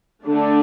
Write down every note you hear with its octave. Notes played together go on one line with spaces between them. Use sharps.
D3 A3 D4